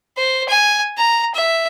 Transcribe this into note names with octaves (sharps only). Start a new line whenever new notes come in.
C5
G#5
A#5
E5